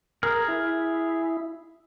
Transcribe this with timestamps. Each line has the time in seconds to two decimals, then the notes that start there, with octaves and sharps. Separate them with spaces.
0.23 G#4 A#4 F6
0.48 E4